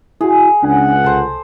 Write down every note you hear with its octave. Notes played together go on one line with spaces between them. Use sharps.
E4 F#4 G#4
C#2 D4 F#5 G#5
C2 A4 C5